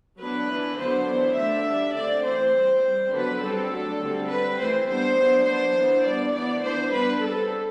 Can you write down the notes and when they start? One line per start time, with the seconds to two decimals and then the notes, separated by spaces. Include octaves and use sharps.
0.19 F#3 B3 D4 B4
0.48 E3 B3 D4
0.77 D3 F#3 B3 D4 C5
1.06 E3 B3 D4
1.36 D3 A3 D4 E5
1.66 G3 D4
1.95 D3 A3 C4 D5
2.24 E3 A3 C4 C5
2.53 G3 C4
2.83 G3 C4
3.11 D3 F#3 B3 D4 B4
3.41 G3 C4 A4
3.70 F#3 A3 D4
3.99 D3 G3 C4
4.28 G3 C4 B4
4.58 E3 A3 C4 C5
4.87 G3 B3 D4 C5
5.17 F#3 B3 D4
5.45 F#3 B3 D4 C5
5.75 E3 B3 D4
6.04 G3 B3 D4 D5
6.33 E3 B3 D4 D5
6.62 E3 B3 D4 C5
6.92 G3 B3 D4 B4
7.21 G3 C4 A4